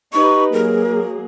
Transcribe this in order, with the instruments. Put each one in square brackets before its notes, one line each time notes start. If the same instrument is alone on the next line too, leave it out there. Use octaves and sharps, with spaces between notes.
[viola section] D#4 G4 B4 [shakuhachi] C#6
[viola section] F#3 A#3 G#4 [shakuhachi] A#4